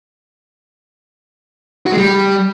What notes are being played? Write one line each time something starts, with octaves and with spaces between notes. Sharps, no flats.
F#4
G#3
G3